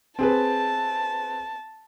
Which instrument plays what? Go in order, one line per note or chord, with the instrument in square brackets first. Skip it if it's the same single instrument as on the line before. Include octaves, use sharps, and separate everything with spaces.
[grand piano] C4 G#4 B4 [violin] A5